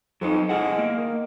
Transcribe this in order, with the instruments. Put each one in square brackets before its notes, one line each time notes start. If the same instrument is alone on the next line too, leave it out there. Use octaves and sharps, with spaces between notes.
[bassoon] F2 [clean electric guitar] F#3 D#4
[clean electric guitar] C#2 E4 F#5 [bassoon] G#3
[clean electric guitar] A#3
[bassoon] D#3